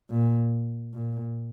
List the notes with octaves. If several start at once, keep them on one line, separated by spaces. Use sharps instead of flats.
A#2
A#2